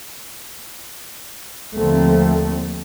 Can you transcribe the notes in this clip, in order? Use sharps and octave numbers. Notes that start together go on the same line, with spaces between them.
D#2 D3 F3 A3 A#3 C4